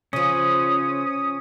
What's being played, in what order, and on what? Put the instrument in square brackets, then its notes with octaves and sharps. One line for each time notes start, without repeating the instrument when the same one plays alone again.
[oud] C#3 F3 [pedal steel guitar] C#4 [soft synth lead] D#6